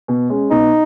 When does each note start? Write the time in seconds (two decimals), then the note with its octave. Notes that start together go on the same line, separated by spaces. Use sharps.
0.08 B2
0.30 G#3 C#4
0.51 B2 D#4